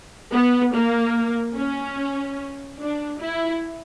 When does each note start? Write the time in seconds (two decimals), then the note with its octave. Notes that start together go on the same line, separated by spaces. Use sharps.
0.33 B3
0.74 A#3
1.56 C#4
2.80 D4
3.20 E4